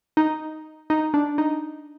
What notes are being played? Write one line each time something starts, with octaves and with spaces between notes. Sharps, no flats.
D#4
D#4
D4
D#4